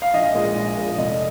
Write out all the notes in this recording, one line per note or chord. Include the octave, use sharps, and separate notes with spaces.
F5
A#1 D#5
A#2 G#3
A#1
A#2 G#3
F1 D#5